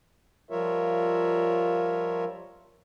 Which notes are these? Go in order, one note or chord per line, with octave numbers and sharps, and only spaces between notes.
F3 G3 F4 A#4 C#5 E5